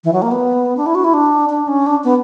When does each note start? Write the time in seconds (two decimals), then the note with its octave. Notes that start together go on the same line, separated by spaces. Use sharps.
0.04 E3
0.13 F#3
0.22 A#3
0.31 B3
0.77 D4
0.86 E4
0.95 F#4
1.04 E4
1.14 D4
1.50 D4
1.68 C#4
1.86 D4
2.04 B3